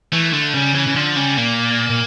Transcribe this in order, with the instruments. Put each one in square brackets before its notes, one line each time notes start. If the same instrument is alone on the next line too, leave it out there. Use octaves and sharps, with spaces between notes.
[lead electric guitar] E3 [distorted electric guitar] A3
[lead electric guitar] D3 [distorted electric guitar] A3
[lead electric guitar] C#3 [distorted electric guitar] G3
[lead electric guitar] C#3 [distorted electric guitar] E3
[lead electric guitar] C#3
[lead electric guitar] D3 [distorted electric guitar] F3
[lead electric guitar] C#3 [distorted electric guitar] G3
[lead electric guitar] A#2 [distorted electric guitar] A#3
[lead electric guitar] A#2